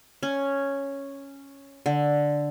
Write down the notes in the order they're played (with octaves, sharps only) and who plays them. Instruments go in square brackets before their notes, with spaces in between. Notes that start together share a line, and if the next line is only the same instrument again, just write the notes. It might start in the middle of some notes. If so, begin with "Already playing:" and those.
[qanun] C#4
D3